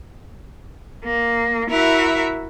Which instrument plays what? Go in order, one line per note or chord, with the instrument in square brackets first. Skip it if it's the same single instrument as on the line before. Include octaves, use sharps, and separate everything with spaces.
[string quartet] A#3
E4 F#4 A#4 E5